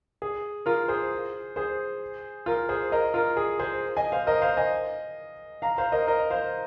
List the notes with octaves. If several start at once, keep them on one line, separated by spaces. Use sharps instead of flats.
G#4
F4 A#4
G#4 C5
G#4 C5
F4 A#4
G#4 C5
A#4 D#5
F4 A#4
G#4
G#4 C5
D#5 G#5
C5 F5
A#4 D#5
C5 F5
D#5 G#5
F5 A#5
C5 F5
A#4 D#5
A#4 D#5
C5 F5